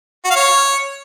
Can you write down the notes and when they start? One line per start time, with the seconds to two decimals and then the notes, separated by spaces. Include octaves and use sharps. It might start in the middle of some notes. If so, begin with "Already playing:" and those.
0.25 F#4
0.30 F5
0.36 C#5